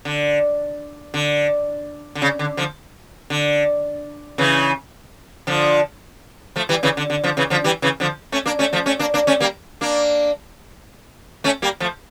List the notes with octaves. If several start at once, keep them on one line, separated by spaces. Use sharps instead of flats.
D3
D3
D3
C#3
D3
D3 F3
D3
C#3 E3
D3 F3
F3 A3
E3 G3
C#3 E3
D3
D3
D3 F3
C#3 E3
D3 F3
E3 G3
C#3 E3
D3 F3
A3 C#4
A#3 D4
A3 C#4
F3 A3
A3 C#4
A#3 D4
A#3 D4
A3 C#4
G3 A#3
A#3 D4
A3 C#4
G3 A#3
F3 A3